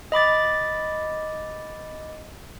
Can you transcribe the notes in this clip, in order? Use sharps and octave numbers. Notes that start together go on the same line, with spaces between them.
D#5 B5 D6 A6